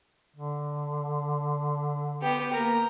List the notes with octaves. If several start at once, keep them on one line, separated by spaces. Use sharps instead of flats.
D3
B3 G4
A#3 A#4 A#5